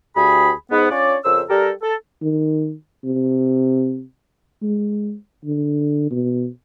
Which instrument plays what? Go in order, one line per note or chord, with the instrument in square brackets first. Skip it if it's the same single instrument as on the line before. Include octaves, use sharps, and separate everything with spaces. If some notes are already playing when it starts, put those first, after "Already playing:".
[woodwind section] D2 G4 G#4 B5
G#2 B3
C#4 D4 F4 C#5 D5
F2 C#3 A#4 C5 E6
G3 G4 A4 A#4
A4
[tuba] D#3
C3
G#3
D3
B2